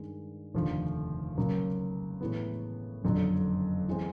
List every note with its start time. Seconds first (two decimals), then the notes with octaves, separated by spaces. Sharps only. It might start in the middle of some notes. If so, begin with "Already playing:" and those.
Already playing: G2 D#3 G#3
0.54 F1 D#2 D3 F3
1.38 C#2 C#3 F#3 A#3
2.21 A2 E3 G#3 B3
3.04 F#1 F2 D3 F#3
3.88 E3 G#3 C4